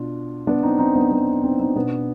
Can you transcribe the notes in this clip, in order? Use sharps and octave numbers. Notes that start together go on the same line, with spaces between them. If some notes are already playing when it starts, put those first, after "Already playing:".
Already playing: B2 D4 F4
B3 D4
C4 D#4
C4 D#4
B3 D4
B3
C4 D#4
C4 D#4
B2 B3 D4